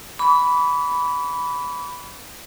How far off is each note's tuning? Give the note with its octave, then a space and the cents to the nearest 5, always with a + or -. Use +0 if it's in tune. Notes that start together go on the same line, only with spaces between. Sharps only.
B5 +0 D6 -45